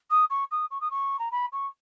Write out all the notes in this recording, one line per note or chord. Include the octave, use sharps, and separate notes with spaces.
D#6
C#6
D#6
C#6
D#6
C#6
A#5
B5
C#6